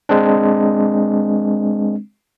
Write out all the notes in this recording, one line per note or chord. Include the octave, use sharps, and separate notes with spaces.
G#3 C4 D4